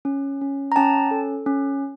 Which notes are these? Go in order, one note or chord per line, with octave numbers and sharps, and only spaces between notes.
C#4
C#4
A#5
C#4 G5 A5
A4
C#4